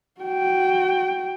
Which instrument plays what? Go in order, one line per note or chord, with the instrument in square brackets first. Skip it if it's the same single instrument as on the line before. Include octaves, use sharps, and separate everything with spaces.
[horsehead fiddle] F#4 G5